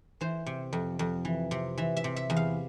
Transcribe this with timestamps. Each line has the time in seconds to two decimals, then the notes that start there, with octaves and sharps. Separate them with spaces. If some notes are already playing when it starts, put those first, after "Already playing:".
0.21 E3 C5
0.46 C3
0.73 F2
0.99 F2
1.25 E3
1.51 C3
1.78 E3 E5
1.97 E5
2.04 C3
2.16 E5
2.30 E2
2.37 F5